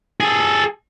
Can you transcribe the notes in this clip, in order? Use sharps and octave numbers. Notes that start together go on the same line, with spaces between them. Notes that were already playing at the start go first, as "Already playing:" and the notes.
G#4 A4